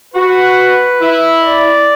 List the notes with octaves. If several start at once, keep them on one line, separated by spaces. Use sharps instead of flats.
F#4 B4
E4
D5